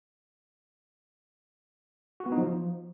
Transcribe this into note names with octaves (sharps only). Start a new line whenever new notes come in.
F#4
B3
D#4
F3